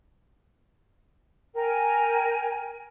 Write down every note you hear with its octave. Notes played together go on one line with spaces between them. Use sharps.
A#4 G5 G#5